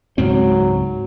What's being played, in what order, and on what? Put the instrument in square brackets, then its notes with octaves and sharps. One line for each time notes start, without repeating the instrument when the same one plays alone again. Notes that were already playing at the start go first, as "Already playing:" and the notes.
[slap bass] C#2 G#2 C4 [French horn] F#3